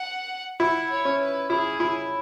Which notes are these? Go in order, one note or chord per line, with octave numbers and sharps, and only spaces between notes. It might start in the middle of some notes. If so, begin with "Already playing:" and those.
Already playing: F#5
E4 F#5
C#5
C#4
B4
E4 G#4
E4